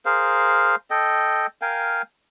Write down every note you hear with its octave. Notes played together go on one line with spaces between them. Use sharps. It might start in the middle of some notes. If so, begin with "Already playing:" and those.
G#4 A#4 C5 F5
A4 D#5 G5
A#4 F5 G5 G#5